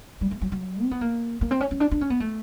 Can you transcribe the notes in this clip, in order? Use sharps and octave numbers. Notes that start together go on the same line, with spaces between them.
G3
A3
F#3
F#3
C4
B3
A#3
A#3
C4
C#4
C#4
D4
D4
C#4
B3
A3